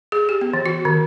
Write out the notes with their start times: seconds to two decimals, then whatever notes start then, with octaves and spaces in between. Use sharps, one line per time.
0.12 G#4
0.29 G4
0.41 B3
0.54 E3
0.66 F#4
0.85 D#3